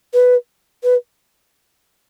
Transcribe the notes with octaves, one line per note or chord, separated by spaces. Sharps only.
B4
B4